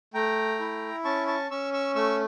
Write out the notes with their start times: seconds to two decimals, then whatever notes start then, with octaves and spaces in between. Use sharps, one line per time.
0.14 A3 G5 A#5
0.60 E4
1.05 C#4 A5 C#6
1.27 A5 C#6
1.51 C#4 C#6 E6
1.73 C#6 E6
1.95 A3 C#6 E6